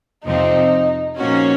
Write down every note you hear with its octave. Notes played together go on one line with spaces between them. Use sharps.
F2 C3 F3 C4 D#4
A#2 F3 A#3 C#4 D#4 F#4